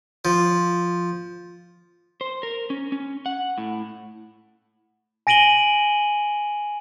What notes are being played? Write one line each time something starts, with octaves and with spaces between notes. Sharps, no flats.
F3
C5
A#4
C#4
C#4
F#5
A2
G#5 A#6 D7 D#7 F#7 G7